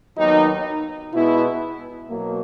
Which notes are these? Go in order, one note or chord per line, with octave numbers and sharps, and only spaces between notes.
D#2 D#3 F#3 B3 D#4
B2 G#3 B3 E4
B2 F#3 A#3